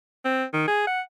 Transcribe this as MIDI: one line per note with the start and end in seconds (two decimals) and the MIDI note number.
0.24 0.44 60
0.53 0.66 51
0.67 0.85 68
0.87 1.01 78